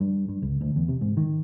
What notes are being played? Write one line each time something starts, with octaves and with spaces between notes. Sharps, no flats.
G2
G2
C#2
D2
E2
C3
G#2
D#3